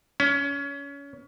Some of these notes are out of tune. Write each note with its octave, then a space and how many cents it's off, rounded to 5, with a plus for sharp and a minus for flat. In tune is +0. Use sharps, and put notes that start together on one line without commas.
C#4 +25